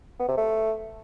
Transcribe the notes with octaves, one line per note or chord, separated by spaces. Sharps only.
B3
C3
A3